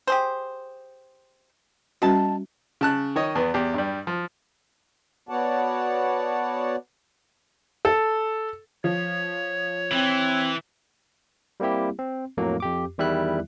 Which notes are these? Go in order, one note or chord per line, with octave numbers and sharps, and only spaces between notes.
G4 G#4 C5
B2 G3 C#4 F#4 A5
C#3 A5 F#6
D#3 C#5 D#5
E2 B3
E2 G4
G2 G3
F3
B3 F#4 C#5 D5 F#5 A5
A4
F3 C#5
E3 C4
G3 A#3 C4 E4 G4
C4
F2 A2 F#3 A#3
F2 G4 D6
E2 D#3 G3 E4 E5 F#6